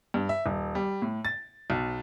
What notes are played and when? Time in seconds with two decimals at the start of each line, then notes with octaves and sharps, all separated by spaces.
0.14 G2
0.29 E5
0.46 D#1
0.75 G3
1.02 A2
1.25 A6
1.70 B1